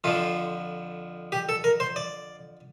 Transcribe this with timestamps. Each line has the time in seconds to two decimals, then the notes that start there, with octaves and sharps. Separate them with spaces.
0.04 F2 D3 F3 F4
1.32 G4
1.49 A4
1.64 A#4
1.80 C5
1.96 D5